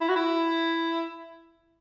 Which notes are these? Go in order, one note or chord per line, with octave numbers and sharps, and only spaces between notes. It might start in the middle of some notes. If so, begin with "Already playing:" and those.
E4
F#4
E4